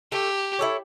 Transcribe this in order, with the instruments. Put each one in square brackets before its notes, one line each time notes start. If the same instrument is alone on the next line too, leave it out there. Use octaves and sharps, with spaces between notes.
[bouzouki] A3 [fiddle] G4
[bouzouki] E4 A4 C#5